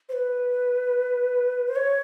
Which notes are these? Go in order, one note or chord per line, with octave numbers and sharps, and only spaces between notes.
C5
B4
C5
C#5